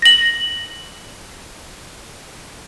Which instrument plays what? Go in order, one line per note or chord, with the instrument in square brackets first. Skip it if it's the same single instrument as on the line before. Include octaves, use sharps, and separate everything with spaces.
[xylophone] A#6 F#7